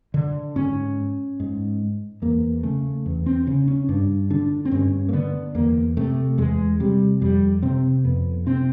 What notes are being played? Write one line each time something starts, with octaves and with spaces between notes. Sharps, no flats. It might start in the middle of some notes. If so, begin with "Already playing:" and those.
D3
G#2 C#4
G#2
E2 A#3
C#3 A3
E2
C4
C#3 C#4
C#4
G2 D4
D3 D4
C4
G2 C#4
A#3
D3 B3
E2 A#3
C3 A3
E2 G#3
C3 G3
F2 G3
C3 C4
F2 B3
C3 C4